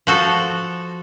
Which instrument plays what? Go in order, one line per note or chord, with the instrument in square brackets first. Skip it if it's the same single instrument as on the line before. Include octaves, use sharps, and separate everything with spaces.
[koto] F3 F#4 A4